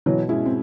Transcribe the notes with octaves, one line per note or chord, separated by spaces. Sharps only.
B2 E3 F#3
G#3 C#4 E4
C4